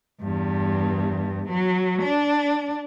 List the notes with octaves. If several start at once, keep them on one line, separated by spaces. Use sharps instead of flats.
E2 G2
F#3
D4